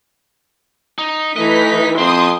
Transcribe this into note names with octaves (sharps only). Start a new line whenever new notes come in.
D#4
E3 A3 D#4 D#5 B6
F2 C4 C6 D#6